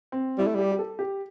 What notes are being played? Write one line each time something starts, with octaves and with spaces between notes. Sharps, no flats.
C4
G3 E4
A3
G3 G4
G4
A4
G4